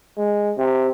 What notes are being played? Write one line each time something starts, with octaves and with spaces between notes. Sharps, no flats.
G#3
C3